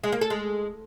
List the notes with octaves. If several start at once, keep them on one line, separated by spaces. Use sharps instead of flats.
G#3
A#3
A4
G#3